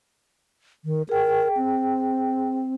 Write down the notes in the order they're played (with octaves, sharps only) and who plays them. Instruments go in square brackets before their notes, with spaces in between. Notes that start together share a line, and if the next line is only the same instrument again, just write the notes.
[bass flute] D#3
[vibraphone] G#4 G5 [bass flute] A#4
[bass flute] C4